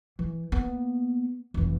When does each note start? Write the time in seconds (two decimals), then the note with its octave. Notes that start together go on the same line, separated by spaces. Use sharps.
0.19 E3
0.52 A#3 B3
1.54 F1 E3